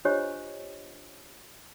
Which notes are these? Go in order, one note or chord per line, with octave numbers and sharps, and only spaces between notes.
D4 F4 G4 C5 C#5 D#5